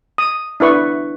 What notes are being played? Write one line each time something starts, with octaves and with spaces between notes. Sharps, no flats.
D#6
D4 E4 B4 C#6